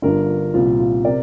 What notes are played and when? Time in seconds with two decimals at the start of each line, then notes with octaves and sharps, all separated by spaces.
0.02 G1 G2 D3 F4 A#4
0.54 C2 A#2 F3 F4
0.79 F4
1.05 C3 A#4 D5